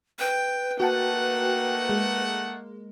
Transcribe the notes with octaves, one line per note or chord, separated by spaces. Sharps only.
B4 G5
A3 A#3 D#4 F#4 F#5 G5 A5
G#3